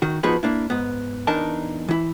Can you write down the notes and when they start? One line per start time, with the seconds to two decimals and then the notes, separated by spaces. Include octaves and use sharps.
0.02 D#3 F#4
0.23 F3 B3 D#4 F#4 G#4 B4
0.43 A#3 D4 E4
0.70 G#2 B3
1.27 E2 E3 D4 D#4 A#4 A5
1.88 E3 E4